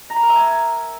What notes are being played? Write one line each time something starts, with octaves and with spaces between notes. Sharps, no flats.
A#5
B5
A#4
E5
G#5